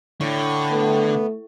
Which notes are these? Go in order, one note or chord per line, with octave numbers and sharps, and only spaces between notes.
A2 D3 C#6
A3 B3